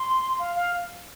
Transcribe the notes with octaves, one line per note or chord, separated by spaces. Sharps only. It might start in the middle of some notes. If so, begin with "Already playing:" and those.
Already playing: C6
F5
F5